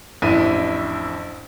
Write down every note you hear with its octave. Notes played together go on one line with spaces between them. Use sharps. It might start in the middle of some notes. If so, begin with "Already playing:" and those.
A1 F2 D4 E4 D#7